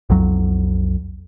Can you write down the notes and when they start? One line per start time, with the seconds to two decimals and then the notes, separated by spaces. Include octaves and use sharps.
0.10 B1 F2 F#3